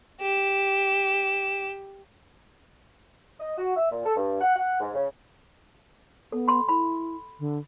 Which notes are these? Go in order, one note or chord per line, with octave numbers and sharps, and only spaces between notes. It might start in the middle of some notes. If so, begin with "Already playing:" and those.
G4 E7
D#5
F#4
E5
A#2
A4
G2
F#5
F#5
G#2
C#3
B3 A4
B5 C6
E4 B5
D3